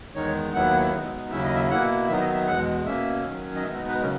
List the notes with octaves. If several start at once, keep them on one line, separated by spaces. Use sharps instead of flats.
E2 D#3 G#3 D#4 C#5
D#2 D#3 F#3 B3 E4 F#5
B2 G#3 B3 D#4
D#2 C#3 F#3 C#4 E4 E5
D#5
E5
B2 A#3 E4 F#5
D#3 F#3 B3 D#4 E5
D#5
E5
E2 B2 G#3 F#5
B2 A#3 C#4 E5
D#3 F#3 C#4
D#5
B2 G#3 B3 D#4 E5
D#5
B4
C#3 F#3 C#4 A#4